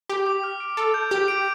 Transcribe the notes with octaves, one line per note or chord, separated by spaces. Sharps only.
G4 D6
D6
F6
D7
A4 D7
G6
G4 D6
D7